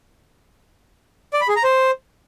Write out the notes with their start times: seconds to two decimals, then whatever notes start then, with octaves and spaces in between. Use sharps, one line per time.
1.33 D5
1.41 B5
1.49 G#4
1.56 A#5
1.64 C5